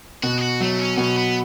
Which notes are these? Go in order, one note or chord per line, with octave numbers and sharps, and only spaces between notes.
B2 F#4
G#4
F#4
F#3 A3
C#4
B2 C#4
B3